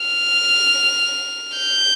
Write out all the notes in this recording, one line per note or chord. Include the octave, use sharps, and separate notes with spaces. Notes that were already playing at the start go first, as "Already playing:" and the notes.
Already playing: F6
G6